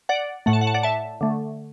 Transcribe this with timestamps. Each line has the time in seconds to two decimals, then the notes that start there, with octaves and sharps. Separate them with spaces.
0.09 D5 F#5
0.46 A2 A3 F#5
0.53 A5
0.61 F#5
0.67 A5
0.74 D5 F#5
0.83 E5 A5
1.21 D3 A3